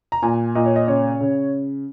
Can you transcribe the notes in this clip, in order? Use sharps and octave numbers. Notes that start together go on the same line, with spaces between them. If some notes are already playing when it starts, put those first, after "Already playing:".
A#5
A#2 G#5
A#2 D#5
C#5
D#5
C#3 C#5
C#3